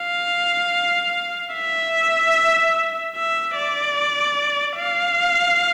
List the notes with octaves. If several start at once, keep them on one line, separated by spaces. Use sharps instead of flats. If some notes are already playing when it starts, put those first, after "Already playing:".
Already playing: F5
E5
E5
D5
F5